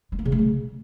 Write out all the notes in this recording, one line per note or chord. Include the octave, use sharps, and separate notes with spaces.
G#3
A#3
C#3
A3
C#3